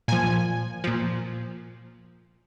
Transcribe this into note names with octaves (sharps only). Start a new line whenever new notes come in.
A#2 F3 G#5
A#2 F3